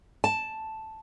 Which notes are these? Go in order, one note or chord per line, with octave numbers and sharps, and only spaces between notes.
A5